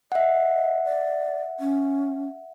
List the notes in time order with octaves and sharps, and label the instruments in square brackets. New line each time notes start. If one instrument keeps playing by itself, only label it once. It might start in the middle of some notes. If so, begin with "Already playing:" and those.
[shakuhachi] D#5 [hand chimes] E5 F#5
[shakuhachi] D5
C#4